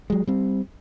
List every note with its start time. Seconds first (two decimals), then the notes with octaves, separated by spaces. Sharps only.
0.10 F#3 G#3
0.27 G3 C4